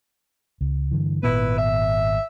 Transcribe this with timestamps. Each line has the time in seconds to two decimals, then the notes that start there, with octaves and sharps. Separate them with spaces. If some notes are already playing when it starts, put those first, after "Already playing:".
0.61 C#2
0.91 G2 D3 E3
1.23 G#1 A#2 B3 E4 B4
1.58 E5